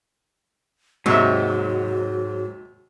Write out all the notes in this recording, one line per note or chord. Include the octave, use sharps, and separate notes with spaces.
D#2 G#2 C3 F#3 F#4 E5